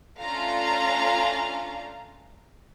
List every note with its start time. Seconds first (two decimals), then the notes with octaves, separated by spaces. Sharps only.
0.20 A3 C#4 D4 F4 F5 A#5